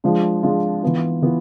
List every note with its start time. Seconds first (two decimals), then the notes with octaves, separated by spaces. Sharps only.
0.04 F3 G#3 D4 F4
0.43 F3 G#3 D4 F4
0.82 E3 B3 F4
1.22 E3 B3 F4